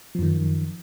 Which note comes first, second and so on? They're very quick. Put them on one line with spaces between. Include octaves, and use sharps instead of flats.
F3 F#2 D#3